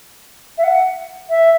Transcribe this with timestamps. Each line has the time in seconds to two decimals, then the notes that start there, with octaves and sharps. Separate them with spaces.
0.57 E5
0.63 F#5
1.29 E5